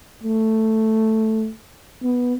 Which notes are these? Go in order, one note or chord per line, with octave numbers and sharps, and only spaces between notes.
A3
B3